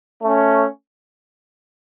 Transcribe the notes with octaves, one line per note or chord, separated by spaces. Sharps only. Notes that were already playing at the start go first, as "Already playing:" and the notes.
A3 C#4